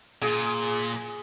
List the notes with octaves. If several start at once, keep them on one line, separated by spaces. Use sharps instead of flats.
A#2 G#4